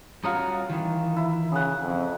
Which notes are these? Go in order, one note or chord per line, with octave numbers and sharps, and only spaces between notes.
G3 C#4 F4 F#4 A#5 D#6
D#3 E3
E4
C#3 G#4 F#5
F2